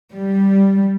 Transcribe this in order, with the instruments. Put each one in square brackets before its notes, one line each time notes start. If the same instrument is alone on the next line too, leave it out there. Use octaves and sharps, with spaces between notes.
[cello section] G3